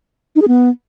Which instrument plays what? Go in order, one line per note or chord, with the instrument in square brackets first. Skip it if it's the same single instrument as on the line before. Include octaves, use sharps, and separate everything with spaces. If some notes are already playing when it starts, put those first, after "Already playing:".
[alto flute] D#4
G#4
B3